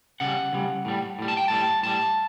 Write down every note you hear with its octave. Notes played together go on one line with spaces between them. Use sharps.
C#3 G3 F#5
C#3 G3
A2 G3
A2 G3
A5
G5
A2 G3 A5
A2 G3 A5